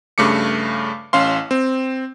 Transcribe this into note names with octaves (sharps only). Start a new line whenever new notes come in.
G2 C#3 A3 D6 C#7
A1 C#4 F5 C6
C4